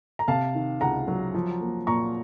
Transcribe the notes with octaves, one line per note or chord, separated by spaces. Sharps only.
A#5
C3 F5 A5
D#3
C#2 F#5 A#5
F#3
F3
A#3
A#2 A#5 C#6